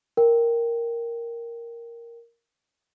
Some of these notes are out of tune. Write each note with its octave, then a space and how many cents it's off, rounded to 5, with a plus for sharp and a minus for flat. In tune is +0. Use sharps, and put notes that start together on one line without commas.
A#4 +0 G5 +0